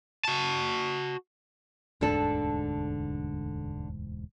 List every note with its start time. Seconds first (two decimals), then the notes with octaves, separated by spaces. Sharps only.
0.25 F#4 A5
2.01 E1 D2 G#2 D3 D4 A4